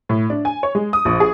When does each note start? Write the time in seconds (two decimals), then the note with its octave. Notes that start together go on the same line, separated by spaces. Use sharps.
0.09 A2
0.30 D4
0.45 G#5
0.63 C#5
0.75 G#3
0.93 D#6
1.05 A#1
1.20 G#4